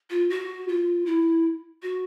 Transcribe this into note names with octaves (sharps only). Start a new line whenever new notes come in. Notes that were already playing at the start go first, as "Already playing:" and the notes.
F4
F#4
F4
E4
F#4